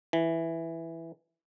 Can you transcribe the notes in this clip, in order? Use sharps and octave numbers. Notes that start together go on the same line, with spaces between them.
E3